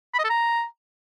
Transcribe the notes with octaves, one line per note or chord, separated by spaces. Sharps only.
B5
D#5
A4
A#5